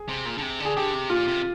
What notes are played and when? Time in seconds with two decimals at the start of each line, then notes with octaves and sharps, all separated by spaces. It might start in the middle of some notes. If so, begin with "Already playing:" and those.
Already playing: G#4
0.09 C3
0.26 A#2
0.38 D3
0.42 C3
0.60 D3
0.65 G#4
0.77 D3 G4
0.93 C3
1.10 A#2 F4
1.27 C3